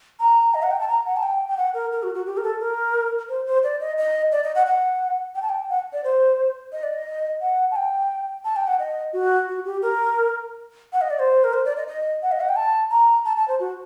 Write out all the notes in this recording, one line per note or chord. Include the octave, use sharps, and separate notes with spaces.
A#5
D#5
F#5
G5
A5
A#5
F#5
A5
G5
G5
F#5
A#4
A#4
F#4
F#4
G4
A#4
A4
A#4
C5
C5
D5
D#5
D#5
D5
D#5
F#5
F#5
G5
A5
G5
F#5
D5
C5
D#5
D5
D#5
F#5
A5
G5
A5
G5
F#5
D#5
F#4
F#4
G4
A#4
F#5
D#5
D5
C5
A#4
C5
D5
D#5
D#5
F#5
D#5
F#5
G5
A5
A#5
A5
A5
C5
F#4